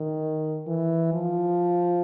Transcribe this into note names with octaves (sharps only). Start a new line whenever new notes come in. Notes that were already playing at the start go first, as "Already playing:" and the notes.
Already playing: D#3
E3
F3